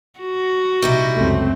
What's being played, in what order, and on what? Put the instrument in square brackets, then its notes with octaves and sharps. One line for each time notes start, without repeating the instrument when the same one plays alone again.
[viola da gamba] F#4
[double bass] A#1 C3 [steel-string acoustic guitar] G3 D#4 E4
[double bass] C#2 F#2 [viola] A3 C4